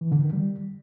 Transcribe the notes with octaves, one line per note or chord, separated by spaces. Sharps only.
E3
D3
D#3
G3